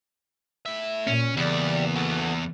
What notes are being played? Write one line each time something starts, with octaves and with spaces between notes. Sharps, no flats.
A2 E5
A#2 C#4
E2 C#3 G3 A#3 D5
F#4 A4